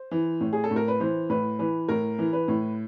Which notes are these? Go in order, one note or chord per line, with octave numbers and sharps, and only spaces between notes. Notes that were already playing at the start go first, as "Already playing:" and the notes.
Already playing: C5
E3
A2
G#4
A4
A2
A#4
B4
E3 C5
A2 B4
E3 B4
A2 A#4
E3
B4
A2